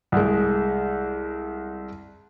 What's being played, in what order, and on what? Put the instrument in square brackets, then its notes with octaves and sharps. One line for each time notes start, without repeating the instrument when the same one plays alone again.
[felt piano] C2 G#3